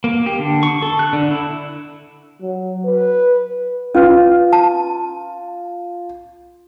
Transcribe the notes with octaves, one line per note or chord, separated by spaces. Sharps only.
A#3
G4
D3
C#6
A4
F#6
D3
E4
F#3
B4
C#4 F4 B4
A5